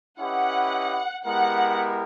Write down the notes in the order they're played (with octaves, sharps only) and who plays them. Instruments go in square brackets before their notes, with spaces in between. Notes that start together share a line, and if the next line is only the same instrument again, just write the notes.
[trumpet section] C#4 E4 G4 B4 D#5 [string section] F#5
[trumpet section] G#3 B3 E4 G4 A#4 [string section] F#5